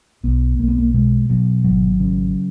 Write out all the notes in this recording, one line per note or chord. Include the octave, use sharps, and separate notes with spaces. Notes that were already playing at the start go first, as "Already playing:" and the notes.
B1 B3
B1 A#3
B3
A#3
B2 G#3
B2 F#3
G#1 F#3
C#3